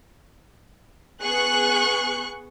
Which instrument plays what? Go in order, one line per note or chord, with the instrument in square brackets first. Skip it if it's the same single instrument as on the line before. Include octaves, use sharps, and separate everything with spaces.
[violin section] B3 G#4 C#6 F#6